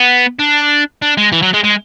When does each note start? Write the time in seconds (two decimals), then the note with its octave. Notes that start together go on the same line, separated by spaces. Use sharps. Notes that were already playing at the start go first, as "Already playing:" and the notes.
Already playing: B3
0.39 D4
1.02 D4
1.17 G#3
1.32 E3
1.42 F#3
1.54 G#3
1.64 G#3